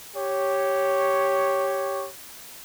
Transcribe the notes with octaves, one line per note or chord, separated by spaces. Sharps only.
G4 C#5